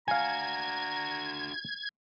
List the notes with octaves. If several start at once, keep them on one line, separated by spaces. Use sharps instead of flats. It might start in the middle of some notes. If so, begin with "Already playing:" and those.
D4 F#4 F5 G#5 A#5 G#6